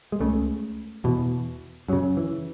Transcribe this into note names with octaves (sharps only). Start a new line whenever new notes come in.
G#3
C#2 C#3 A3
E2 B2
F#2 C#3 F#3
E3